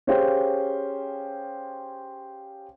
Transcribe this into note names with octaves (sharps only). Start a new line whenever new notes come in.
C#4 G4 G#4 C5 F5 G5